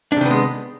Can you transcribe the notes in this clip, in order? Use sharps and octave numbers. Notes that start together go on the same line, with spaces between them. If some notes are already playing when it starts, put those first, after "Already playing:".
C3 D#3 G#3 B3 D4